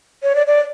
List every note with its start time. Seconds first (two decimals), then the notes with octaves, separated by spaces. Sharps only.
0.23 C#5
0.35 D5
0.47 D5